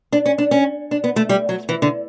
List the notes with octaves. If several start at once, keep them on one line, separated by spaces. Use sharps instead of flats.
D4
C#4
D4
C#4
D4
B3
A3
G3
F#3
E3
D3